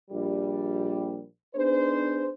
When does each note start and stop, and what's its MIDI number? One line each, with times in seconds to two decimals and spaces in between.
0.11 1.22 34
0.11 1.22 55
1.54 2.29 59
1.54 2.29 62
1.54 2.29 63
1.54 2.29 68
1.54 2.29 71
1.54 2.29 72